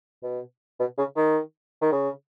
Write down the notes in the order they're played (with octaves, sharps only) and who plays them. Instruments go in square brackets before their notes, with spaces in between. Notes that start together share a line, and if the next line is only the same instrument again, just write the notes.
[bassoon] B2
B2
C#3
D#3
D#3
C#3